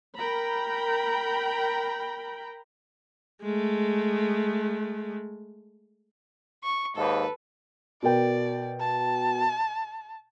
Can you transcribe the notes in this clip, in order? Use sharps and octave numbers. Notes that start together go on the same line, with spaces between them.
A#4 G5 A#5 B5
G#3 A3
C#6
D#2 G#2 A4 B4
B2 A#4 D5 G5
A5